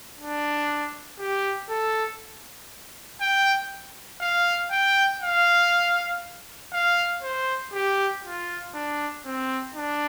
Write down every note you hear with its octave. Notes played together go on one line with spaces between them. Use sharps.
D4
G4
A4
G5
F5
G5
F5
F5
C5
G4
F4
D4
C4
D4